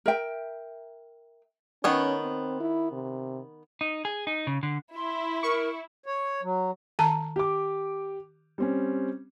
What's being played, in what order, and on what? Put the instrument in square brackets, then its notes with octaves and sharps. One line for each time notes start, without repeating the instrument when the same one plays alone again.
[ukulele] A#4 E5 G5
[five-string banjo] D#3 B3 C#5 [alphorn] C#4
[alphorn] C4
E4
C3
[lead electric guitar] D#4
G#4
D#4
C#3
D3
[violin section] E4 [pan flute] C6
[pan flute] A#4 [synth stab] C#6
[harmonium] C#5
F#3
[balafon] D#3 A5 A#5
[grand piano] G4 D6
G3 C4 C#4